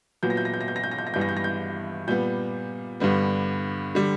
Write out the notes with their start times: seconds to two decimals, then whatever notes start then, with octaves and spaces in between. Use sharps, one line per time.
0.23 A#2 F#3 B3 G6
0.30 A#6
0.37 G6
0.45 A#6
0.54 G6
0.61 A#6
0.68 G6
0.76 A#6
0.84 G6
0.91 A#6
0.98 G6
1.07 A#6
1.14 G2 E3 G3 B3 G6
1.21 A#6
1.29 G6
1.37 A#6
1.44 G6
2.07 A#2 G3 B3 G6
3.00 G2 D3 G3 B3
3.95 D3 G3